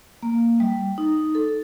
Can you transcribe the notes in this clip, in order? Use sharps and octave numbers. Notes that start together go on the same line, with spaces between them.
A#3
G3
D#4
A4